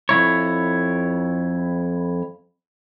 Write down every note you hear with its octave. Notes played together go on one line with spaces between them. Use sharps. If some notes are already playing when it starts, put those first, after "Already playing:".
F2 A#2 E4 C#5